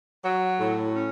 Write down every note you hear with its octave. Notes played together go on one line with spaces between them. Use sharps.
F#3
A2
C#4